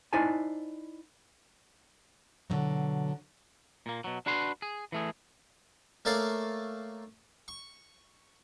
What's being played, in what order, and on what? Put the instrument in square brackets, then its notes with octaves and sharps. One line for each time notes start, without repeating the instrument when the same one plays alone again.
[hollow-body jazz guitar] D#4 E4 C5 D5 G#5 A5
[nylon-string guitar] B2 D3 D#3 F#3
[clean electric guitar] A#2 A#3
B2 F#3
D4 F#4 B4 C6
G#4
E3 A3 G#4
[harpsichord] A3 A#3 A4 C#5 D5 F5
C#6